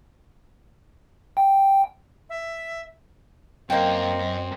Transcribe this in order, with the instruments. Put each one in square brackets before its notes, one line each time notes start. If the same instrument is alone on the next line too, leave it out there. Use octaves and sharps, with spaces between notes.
[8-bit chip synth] G5
[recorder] E5
[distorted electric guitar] F#2 [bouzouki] A#3 G5 [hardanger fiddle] C4 [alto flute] D#5